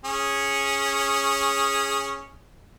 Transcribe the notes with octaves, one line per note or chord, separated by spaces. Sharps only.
C#4 G#4